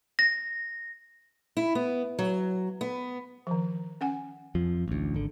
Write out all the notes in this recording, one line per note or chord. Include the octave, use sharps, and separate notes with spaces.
A#6
E4
B3
F#3
B3
D#3 F3
C#4 F#5 G#5
F2 F3
A1 D2
G#1 D3